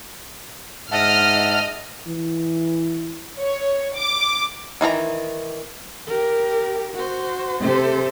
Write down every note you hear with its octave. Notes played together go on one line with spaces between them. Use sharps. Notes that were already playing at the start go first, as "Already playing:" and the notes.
G#2 D#5 E5 F#5 A5 F6
E3
C#5
D6
D#3 E3 F4 A#5
G4 A#4
F#4 C5
C3 A4 C5